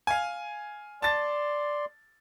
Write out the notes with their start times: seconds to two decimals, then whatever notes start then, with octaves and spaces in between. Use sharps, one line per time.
0.07 F5 G#5
1.02 D5 A5 C6 A6